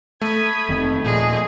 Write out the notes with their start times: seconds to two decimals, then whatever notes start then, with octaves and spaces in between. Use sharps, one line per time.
0.21 A3 B5 D#6 G#6
0.69 F1 D#3 C4
1.04 D#1 A#2 F3 G#3 A#3 G#4